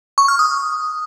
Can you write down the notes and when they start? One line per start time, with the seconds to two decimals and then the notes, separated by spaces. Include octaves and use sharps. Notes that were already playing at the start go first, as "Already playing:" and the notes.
0.18 C#6
0.28 F6
0.39 D#6